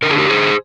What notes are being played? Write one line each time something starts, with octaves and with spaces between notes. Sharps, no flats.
D3 A#4
G#4
G4 A#4
G#4 C5